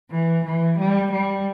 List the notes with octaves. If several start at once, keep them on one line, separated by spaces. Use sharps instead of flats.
E3
E3
G3
G3